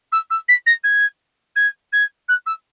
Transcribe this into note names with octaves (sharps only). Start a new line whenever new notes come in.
E6
E6
B6
A#6
G#6
G#6
G#6
F#6
E6